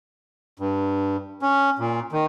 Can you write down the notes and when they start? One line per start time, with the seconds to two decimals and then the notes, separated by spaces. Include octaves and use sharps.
0.59 G2
1.42 C#4
1.79 A#2
2.12 D#3